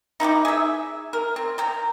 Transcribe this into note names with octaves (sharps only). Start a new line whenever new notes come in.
D#4 E4 F#4 G4
G#4 E5
A#4
C4
G5 A#5